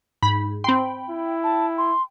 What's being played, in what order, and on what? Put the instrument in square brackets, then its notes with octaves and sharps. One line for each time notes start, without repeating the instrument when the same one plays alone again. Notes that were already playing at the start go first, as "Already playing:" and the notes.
[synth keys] G#2 [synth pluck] B5
[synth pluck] C4 C6 [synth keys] G5 B5
[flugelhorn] E4
[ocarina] A5
C6